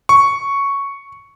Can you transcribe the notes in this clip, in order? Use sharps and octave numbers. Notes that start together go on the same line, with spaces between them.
C#6